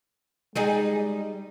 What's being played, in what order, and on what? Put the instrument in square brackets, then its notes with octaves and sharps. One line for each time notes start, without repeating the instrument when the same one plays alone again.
[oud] G3 D#4 G#4 [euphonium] G#3